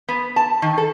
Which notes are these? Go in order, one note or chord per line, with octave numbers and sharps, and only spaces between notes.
B3
A5
D#3
A4